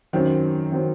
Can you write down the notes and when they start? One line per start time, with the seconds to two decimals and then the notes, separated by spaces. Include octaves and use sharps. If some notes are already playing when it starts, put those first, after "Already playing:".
0.13 F#2 D#3 F#3 C4
0.72 D#3 F#3 C4